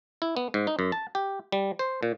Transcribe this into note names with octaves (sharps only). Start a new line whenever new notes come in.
E4
B3
G#2
D#4
F#2
A5
G4
G3
C5
A#2